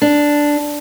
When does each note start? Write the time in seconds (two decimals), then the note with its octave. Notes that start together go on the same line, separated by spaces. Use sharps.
0.02 D4